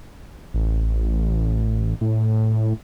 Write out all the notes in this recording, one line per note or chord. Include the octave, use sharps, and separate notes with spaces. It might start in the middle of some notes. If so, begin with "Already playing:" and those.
A1
A2